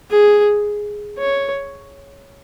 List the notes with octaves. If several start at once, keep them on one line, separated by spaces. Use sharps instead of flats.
G#4
C#5